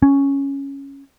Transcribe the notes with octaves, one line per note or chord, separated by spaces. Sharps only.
C#4